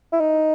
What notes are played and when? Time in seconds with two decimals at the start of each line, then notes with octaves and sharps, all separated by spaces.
0.12 E4
0.20 D#4